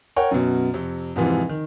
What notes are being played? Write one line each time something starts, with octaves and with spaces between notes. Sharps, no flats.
A#4 C#5 F#5 G5
F#2 B2
F2 C3
F2 G#2 C3 E3 F3
D#3